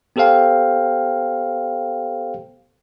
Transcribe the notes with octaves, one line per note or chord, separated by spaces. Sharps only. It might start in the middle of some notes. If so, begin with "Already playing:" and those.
B3 G4 A4 C5 F5 G5